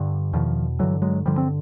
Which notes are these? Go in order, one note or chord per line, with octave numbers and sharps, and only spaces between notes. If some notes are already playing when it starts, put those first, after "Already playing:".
Already playing: G2 D3
E2 B2 D#3 F3
G2 D3 E3 F#3
F#3 G#3
G2 D3 F3 G3
C4